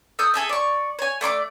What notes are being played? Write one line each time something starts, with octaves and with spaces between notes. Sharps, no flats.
A4 D#6 G6
G#4 A4 E5
D5 C#6
C#5 G#5
A3 D5 C6 D6